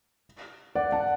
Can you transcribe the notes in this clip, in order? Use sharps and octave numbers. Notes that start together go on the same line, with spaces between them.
D5 F#5
F#5 A5